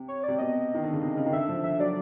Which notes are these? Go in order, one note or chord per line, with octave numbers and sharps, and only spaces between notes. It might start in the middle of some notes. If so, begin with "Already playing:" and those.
Already playing: C3
C#5
C3 D5
B2 D#5
D#3
D3
C#3
C3
C#3
D#3
D3 E5
F3
D3 E5
F#3 D5